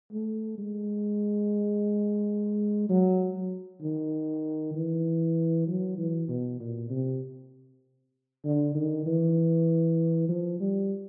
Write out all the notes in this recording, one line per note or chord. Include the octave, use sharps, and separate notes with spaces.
A3
G#3
F#3
D#3
E3
F#3
E3
B2
A#2
C3
D3
D#3
E3
F3
G3